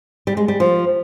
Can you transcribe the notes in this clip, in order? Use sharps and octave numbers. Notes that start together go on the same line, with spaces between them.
G3
G#3
G3
F3